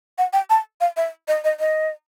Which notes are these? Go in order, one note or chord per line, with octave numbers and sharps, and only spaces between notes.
F#5
G5
A5
F5
E5
D#5
D#5
D#5